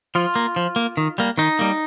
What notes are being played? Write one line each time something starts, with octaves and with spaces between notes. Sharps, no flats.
F3 F4
A#3
F3
A#3
D#3
G3 A#3
D#3 D#4
G3 A#3